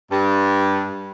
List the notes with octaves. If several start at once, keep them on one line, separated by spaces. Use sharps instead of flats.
G2